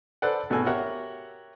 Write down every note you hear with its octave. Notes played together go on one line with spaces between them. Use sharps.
A4 B4 C5 D5 F#5
G#1 B2 F#4 A4 G#5
F#4 G4 A#4 C#5 E5 F#5